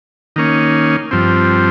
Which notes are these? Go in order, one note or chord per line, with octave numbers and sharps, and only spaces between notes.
D#3 A#3 C#4
G2 F3 C4